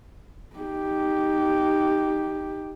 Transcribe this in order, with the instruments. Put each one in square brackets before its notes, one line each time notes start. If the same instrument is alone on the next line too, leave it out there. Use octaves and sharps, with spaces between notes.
[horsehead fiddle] D#4 G4